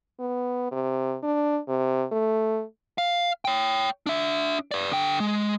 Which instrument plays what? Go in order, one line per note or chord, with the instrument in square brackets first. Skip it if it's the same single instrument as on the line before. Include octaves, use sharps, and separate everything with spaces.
[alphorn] B3
C3
D4
C3
A3
[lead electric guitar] F5
C#5 G5
D4 E5
B4 D5
D3 G5
G#3